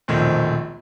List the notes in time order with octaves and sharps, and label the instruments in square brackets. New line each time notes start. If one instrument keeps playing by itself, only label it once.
[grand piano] E1 A#1 D#3 A3 C4